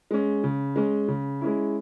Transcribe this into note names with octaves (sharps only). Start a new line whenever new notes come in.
G#3 C#4
C#3
G#3 C#4
C#3
G#3 C#4 E4